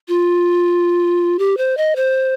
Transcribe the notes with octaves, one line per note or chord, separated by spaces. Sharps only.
F4
G4
C5
D#5
C5